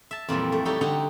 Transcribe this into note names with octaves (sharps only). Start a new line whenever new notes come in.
E5 A5
F2 A#2 E3 G3
A3
G3 D#4 G4 A4 C#5
D3 D#4 G4 F#5 A#5